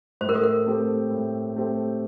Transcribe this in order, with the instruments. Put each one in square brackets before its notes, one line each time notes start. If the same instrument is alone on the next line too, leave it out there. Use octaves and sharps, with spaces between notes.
[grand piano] A2 [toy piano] C5
[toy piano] A#4
A4
A#4
[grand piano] A3 C4 G4
A2
A3 C4 G4